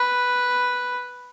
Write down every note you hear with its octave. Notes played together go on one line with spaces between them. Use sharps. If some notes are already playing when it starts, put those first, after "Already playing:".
Already playing: B4